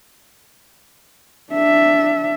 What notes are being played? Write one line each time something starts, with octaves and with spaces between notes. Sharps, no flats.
D4 E5